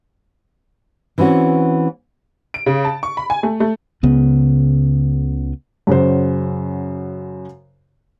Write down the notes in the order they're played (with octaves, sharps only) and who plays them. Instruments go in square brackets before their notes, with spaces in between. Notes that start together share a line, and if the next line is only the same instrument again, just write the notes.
[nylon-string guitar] E3 C4 C#4 F#4
[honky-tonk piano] D7
C#3
A5
C#6
B5
G#5
A3
A3
[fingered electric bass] C#2 C#3 B3
[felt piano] F#2 C#3 F#4 C5